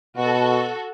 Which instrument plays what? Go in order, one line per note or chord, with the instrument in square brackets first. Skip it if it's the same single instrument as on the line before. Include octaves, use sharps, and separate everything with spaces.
[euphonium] B2 [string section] F#4 A4